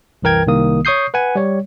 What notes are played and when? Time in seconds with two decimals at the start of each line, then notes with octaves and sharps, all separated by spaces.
0.22 C2 F#2 E3 A#4 G5 G#6
0.48 C2 D#3 A#3 D#6
0.85 C#5 C#6 D#6 G6 C7
1.14 B4 F#5 G#5
1.35 G3 C#5